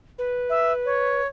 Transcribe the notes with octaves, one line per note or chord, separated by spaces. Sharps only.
B4
E5
C#5